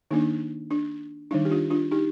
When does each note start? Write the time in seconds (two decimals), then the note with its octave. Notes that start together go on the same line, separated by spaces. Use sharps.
0.11 D#3 A#3 D4 D#4
0.71 D4
1.31 D#3 G3 D4 D#4
1.45 G4
1.51 D4 F4
1.70 D4 F4
1.91 D#4 G4